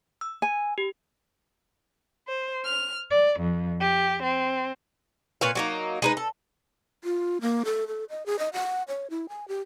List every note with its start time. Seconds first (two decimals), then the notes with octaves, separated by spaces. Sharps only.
0.21 E6
0.42 G#5
0.78 G4
2.27 C5
2.64 F6
3.09 D5
3.39 F2
3.80 G4
4.22 C4
5.41 A#2 B4 C#5 F5
5.55 F#3 A#3 D#4
6.02 G#3 D#4 B4
6.17 A4
7.04 F4
7.41 A#3
7.65 A4
7.88 A4
8.10 D#5
8.26 G#4
8.39 D#5
8.53 F#5
8.88 C#5
9.10 E4
9.29 G#5
9.48 G4